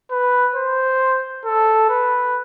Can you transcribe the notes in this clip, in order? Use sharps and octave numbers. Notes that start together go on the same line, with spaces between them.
B4
C5
A4
B4